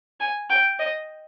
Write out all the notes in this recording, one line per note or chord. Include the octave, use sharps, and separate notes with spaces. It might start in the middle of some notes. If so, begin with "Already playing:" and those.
G#5
G5
D#5